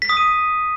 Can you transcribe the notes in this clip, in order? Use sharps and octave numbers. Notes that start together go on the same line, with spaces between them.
B6
D#6
D#7